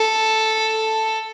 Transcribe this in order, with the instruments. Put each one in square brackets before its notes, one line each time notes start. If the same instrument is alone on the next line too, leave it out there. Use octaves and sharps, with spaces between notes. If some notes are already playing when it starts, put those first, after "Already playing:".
Already playing: [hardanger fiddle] A4